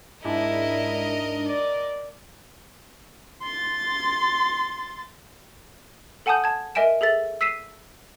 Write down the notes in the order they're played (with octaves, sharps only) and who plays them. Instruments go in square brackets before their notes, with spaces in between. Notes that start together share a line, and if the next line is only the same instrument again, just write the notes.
[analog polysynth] G#2 D4 [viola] E4 [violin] A#4 D#5
[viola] D5
[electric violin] C6 A6
[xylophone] A4 F#5 G#5 A5 D#6 G6
A5 G#6
A#4 D#5 E5 G#5 D7 E7
G#4 A4 E5 A6
E6 B6 C7 D#7 E7